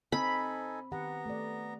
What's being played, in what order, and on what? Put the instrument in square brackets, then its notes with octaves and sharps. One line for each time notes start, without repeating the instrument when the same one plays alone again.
[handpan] C4 [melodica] D#4 A4 G#5 [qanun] B5
[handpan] D#3 G4 F#5 [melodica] B3 A#5
[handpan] A3 D5